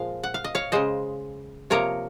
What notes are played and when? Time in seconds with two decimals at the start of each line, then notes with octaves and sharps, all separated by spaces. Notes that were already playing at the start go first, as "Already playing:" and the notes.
Already playing: A#2 F3 G#3 F5
0.23 F#5
0.34 F5
0.44 D#5
0.55 C#5 F5
0.72 C#3 G#3 C5 D#5
1.70 C3 F3 A#3 A#4 C#5